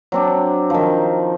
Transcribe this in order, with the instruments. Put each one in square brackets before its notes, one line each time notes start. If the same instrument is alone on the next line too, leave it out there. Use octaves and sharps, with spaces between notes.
[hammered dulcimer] F#3 C4 D4
D#3 F3